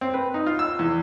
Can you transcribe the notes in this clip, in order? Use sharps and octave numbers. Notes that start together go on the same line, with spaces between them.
C4
B4
D#4
F4
E6
E2